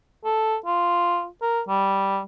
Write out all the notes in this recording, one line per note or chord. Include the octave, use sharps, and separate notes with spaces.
A4
F4
A#4
G3